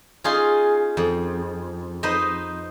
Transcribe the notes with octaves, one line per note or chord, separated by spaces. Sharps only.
C#4 D#4 F4 G#4 C6
F2
D#4 B4 C5 D#5